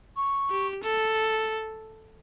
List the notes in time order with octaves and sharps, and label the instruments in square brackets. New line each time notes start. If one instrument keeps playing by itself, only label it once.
[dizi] C#6
[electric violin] G4
A4